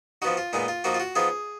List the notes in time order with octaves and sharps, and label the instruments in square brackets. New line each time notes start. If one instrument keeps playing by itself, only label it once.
[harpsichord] F3 B3 D#4 F#4
F4
A#2 G#3 B3 D#4
F4
F3 A#3 D#4 F#4
F4
F#4
F3 B3 D#4 G#4